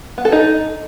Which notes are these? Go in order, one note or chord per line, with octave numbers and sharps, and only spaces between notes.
B3
A4
D#4